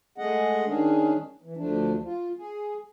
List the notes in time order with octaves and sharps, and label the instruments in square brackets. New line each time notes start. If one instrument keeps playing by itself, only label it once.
[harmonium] G#3 A3 G#4 D#5 F#5
D#3 C#4 D4 G#4
E3
D2 F3 A3 D4
F4
G#4